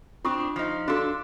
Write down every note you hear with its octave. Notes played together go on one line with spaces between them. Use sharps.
C4 D4 F4 C#6 D#6
F3 D#4
D4 F#4 A4 F5 C6